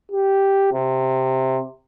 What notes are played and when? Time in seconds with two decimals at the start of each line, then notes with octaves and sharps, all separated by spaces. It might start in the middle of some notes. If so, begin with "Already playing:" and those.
0.11 G4
0.73 C3